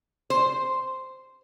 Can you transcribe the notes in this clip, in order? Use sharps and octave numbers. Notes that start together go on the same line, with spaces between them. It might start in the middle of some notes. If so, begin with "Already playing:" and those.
C5